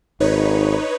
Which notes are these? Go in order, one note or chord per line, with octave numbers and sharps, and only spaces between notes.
G#1 D#4 B4 C#5